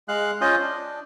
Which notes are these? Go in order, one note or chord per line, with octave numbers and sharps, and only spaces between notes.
G#3 F5 F#6
C#4 F4 C5 D#5
D4